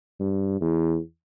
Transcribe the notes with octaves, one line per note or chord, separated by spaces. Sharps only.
G2
E2